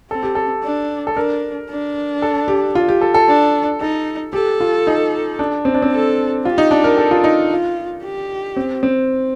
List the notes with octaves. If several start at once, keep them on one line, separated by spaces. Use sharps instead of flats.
C4 A4
G4
A4
D4
A4
D4 A#4
D4
A4
G4
F4
G4
A4
A4
D4
D#4 A4
G4 A4
F4
D#4
D4
C4
D4
C4
A4
F4 G4
D#4
D4
A#4
A4
F4
D#4
F4
G4
C4
C4